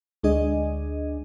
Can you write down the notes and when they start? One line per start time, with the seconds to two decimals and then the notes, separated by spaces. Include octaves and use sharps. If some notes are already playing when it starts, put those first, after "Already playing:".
0.23 D2 G#3 D4 G#4 D#5